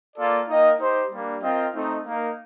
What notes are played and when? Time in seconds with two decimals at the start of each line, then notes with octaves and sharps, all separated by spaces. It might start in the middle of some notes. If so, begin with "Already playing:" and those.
0.16 A#3 F4 A4 D5
0.47 A#3 D#4 A#4 D#5 G5
0.79 D#4 G4 C5
1.10 G3 A#3 D4
1.41 C4 F4 A#4 D#5 G5
1.73 A3 C4 D#4
2.04 A#3 D#4 A#4